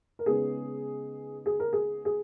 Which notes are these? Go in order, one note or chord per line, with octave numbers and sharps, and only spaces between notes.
A#4
C#3 G#3 B3 D#4 G#4
G#4
A#4
G#4
G#4